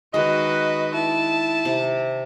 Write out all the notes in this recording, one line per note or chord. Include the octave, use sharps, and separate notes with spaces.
D#3 G#3 F#4 B4 D#5
E4 A5
C3